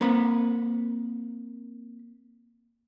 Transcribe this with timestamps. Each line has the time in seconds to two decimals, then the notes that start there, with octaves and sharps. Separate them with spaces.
0.01 A#3 C4 B5